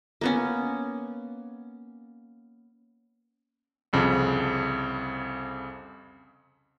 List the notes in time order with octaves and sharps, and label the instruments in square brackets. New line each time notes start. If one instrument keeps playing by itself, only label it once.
[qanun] A#3 B3 C#4
[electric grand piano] C2 F2 C#3